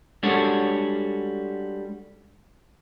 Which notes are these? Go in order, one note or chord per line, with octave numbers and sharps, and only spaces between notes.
G3 G#3 D4 F#4 A4 C#5